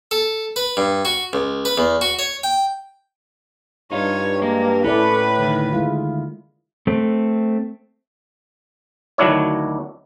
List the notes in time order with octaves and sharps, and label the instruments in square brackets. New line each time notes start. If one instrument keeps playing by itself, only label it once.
[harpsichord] A4
B4
G2
F#4
C#2
B4
E2
F#4
C#5
G5
[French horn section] G2 [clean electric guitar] D#4 F4 [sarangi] C#5
[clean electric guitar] G#3 [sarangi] A#3
[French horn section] A2 [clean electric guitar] C#4 [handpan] E4 A4 D5 [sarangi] B4
[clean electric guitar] D2 D#3
[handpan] G#3 E4 F4
[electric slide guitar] A3 C4
[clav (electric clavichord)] D2 D#3 F#3 D4 E4 C#5